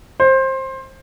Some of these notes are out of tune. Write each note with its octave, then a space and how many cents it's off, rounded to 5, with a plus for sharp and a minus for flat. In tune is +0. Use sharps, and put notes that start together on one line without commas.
C5 +20